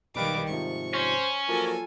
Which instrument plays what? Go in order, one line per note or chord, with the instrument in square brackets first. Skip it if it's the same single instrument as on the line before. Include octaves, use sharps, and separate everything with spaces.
[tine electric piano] B1 B4 F5 [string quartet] D#3 G3 D6
[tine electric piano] G#2 C3 F3 [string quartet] C#6
[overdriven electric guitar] C#4 [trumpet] C5
[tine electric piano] F3 F#3 A#3 [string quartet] F4 A4 G#5 [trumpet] A#4